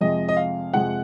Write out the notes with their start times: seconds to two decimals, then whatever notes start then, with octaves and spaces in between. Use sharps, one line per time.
0.01 F2 C3 F3 G#3 D#5
0.28 D#5
0.37 F5
0.73 F2 C3 F3 G#3 F#5